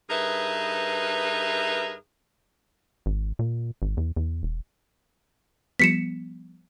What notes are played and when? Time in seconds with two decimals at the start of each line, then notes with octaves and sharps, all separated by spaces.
0.10 G2 D#4 G#4 A#4 B4 E5
3.06 G#1
3.39 A#2
3.82 G#1
3.97 E2
4.16 E2
4.43 E1
5.80 F3 G3 B3 B6 C#7 E7